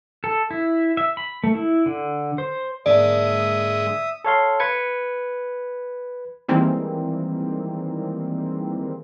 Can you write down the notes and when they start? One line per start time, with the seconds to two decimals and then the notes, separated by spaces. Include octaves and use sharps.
0.24 A4
0.51 E4
0.97 E5
1.17 B5
1.44 A3
1.55 E4
1.86 D3
2.38 C5
2.86 G#2 D3 G#3 A#3 D5 E5 D#6
4.25 A4 C#5 F5 C6
4.60 B4 G#6 C#7
6.48 D#3 E3 G3 G#3 A#3 C4